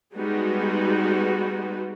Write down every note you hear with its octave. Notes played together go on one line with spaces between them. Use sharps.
G3 G#3 B3 D#4 F#4